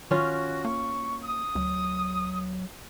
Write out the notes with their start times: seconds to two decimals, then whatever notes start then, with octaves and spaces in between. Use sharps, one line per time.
0.11 D#3 C#4 F4 F#4
0.65 A#3 C#6
1.24 D#6
1.55 D2 F#3